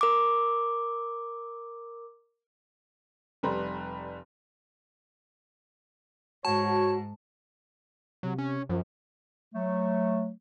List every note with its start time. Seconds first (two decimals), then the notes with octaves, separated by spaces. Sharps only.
0.01 A#4 D6
3.43 F1 G3 B4 D5 A#5 C6
6.45 G#2 F#4 C#5 A5
8.23 C3 F#3
8.38 C#4
8.69 F#2 F3
9.54 F#3 A3